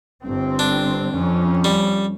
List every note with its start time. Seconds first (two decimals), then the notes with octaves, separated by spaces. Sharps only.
0.22 G1 C4
0.59 D4
1.14 F2 C#4
1.64 G3